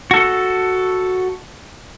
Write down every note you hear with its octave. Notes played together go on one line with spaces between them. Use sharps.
F#4 A4